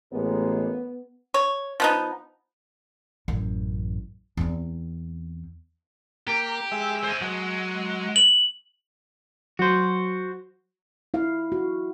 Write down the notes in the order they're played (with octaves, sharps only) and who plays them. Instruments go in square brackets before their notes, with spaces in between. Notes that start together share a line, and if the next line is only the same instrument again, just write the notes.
[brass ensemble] A1 G#3 A#3 [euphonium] B3
[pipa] C#5
F3 B3 D#4
[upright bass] A1 F#2
E2 C4
[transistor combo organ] A#3 [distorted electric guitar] G4
[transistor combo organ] G#3 E5
[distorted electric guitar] C5 G#5
[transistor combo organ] F#3 [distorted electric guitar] G#3
[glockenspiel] F#7
[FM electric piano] F#3 [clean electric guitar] F#4 C5
[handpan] E4 F5
F#4